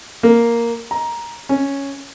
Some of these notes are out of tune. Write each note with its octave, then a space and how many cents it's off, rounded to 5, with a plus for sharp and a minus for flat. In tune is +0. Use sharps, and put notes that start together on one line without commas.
A#3 +0
A#5 +10
C#4 +0